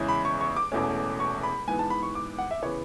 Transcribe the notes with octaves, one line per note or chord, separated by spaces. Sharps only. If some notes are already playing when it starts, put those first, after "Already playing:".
Already playing: E2 C#3 G#3 C#4 E4
B5
C#6
C#6
D6
E1 E2 B2 A3 C#4
C#6
B5
G#2 E3 B3 G#5
A5
B5
C#6
D6
F#5
E5
C#3 E3 B3 C#5